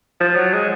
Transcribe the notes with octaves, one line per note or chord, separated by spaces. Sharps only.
F3
F#3
G#3